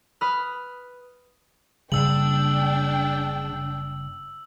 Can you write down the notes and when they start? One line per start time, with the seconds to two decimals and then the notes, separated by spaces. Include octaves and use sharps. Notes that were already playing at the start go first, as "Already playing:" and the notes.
0.21 B4 B5 D#6 F6
1.92 F#1 D#2 C#3 G3 D4 G5 E6 F#7